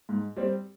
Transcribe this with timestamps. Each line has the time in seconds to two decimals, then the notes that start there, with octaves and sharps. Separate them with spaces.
0.09 G#2
0.37 G3 C4